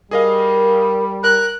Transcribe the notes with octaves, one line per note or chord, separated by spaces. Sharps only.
G3 G#4 A#4 D#5 F5
A#4 F#6